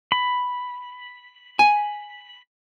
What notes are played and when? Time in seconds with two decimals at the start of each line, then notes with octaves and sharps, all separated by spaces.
0.12 B5
1.59 G#5